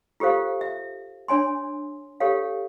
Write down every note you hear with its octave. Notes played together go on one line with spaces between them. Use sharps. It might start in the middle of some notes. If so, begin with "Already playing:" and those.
F4 G4 A4 C5 F5
E5
D4 C#5 G#5 C6
G4 A4 C#5 F5